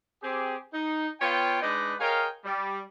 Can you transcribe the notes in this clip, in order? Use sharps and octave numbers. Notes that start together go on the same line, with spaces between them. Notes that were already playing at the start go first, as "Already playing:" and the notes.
C4 G4 G#4
D#4
B3 F4 C#5 F5 G5
G#3 D4 D#4 B4 D5 D#5
G#4 A#4 C#5 D#5 F5 G5
G3